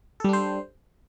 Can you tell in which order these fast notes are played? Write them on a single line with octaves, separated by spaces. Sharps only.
A4 G3 D4 C5